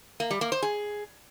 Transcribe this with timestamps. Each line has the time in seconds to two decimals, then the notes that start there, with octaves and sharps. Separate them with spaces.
0.20 A#3
0.31 G3
0.41 A#3
0.52 C5
0.62 G#4